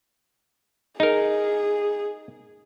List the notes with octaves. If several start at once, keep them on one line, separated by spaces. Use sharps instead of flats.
D#4 G#4 A#4